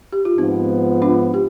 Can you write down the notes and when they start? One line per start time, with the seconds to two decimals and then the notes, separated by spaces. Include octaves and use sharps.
0.13 G4
0.25 F4
0.38 G#2 F3 B3 C4 D#4
1.02 D4 F4
1.34 G4